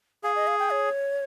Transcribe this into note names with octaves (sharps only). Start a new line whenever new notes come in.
G#4 F5
D#5
F5
G5
C#5